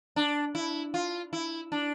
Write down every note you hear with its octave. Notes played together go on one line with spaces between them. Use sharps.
D4
E4
F4
E4
D4